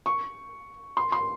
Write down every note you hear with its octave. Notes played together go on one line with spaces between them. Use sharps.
C#6
C6
C6